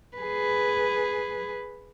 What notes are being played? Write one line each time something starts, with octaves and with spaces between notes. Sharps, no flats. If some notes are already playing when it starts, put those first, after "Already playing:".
G#4 B4